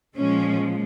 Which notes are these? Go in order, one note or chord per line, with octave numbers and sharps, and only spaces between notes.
A#2 F3 G#3 C#4